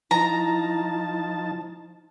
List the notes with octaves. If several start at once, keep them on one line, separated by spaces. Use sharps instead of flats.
F3 D#4 E4 A5 A#5